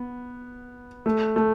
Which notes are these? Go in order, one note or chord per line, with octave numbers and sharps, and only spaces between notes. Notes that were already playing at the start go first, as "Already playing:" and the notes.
Already playing: B3
A3
A3